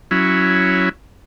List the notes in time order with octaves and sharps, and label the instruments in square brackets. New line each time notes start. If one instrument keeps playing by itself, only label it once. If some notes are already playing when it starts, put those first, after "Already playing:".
[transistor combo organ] F#3 C#4 E4